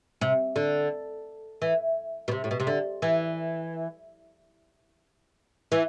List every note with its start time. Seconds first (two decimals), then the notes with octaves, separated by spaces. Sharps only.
0.21 C3
0.56 D3
1.62 E3
2.28 B2
2.31 C3
2.44 A2
2.51 B2
2.60 C3
2.67 D3
3.02 E3
5.72 E3